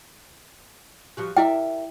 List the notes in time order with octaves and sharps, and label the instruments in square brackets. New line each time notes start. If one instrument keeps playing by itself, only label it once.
[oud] F3 G3 F#4
[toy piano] E4 G5 [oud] A#4 D5 E5